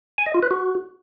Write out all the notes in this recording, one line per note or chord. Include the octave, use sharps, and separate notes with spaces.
G#5
D#5
F4
B4
F#4